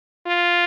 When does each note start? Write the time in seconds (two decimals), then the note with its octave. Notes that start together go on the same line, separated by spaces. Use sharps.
0.27 F4